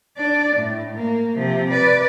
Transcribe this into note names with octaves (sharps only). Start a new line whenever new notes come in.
D4 D5
A2
A#3
C3 F3
B4 D5